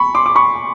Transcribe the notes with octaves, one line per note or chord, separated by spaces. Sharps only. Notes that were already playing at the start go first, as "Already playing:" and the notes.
Already playing: B5 C#6
C6 D6
D6
B5 C#6